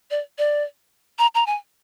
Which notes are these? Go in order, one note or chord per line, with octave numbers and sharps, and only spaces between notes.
D5
D5
A#5
A#5
G#5